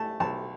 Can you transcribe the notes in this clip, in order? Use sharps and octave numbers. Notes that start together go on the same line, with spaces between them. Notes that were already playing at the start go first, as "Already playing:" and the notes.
Already playing: A3 A5
B1 A5